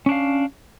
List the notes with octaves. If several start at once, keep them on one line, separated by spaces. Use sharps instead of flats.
C#4 D4 F5